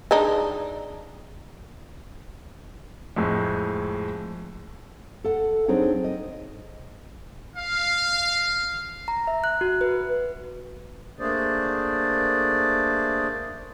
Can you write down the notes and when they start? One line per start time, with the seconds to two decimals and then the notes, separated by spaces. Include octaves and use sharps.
0.11 G#3 D4 D#4
3.16 F2 A2 G#3
5.24 A4 F#5
5.68 F#3 C4 D4 D#4 G#4
6.04 D#5
7.56 F5
9.08 A#5
9.27 E5
9.44 F#6
9.61 F#4
9.81 B4
11.20 A3 A#3 D4 G#4 C5 D5